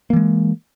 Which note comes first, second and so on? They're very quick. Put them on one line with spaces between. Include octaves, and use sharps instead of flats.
A#3 E3 G#3